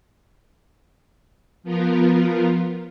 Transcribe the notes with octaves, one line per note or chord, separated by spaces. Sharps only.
F3 B3 F4 A#4